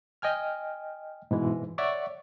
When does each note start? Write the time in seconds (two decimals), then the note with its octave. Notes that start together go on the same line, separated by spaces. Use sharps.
0.22 D#5 G5 G#5 F6
1.31 G#2 B2 E3 G#3
1.78 C#5 D5 E5 F#5 C#6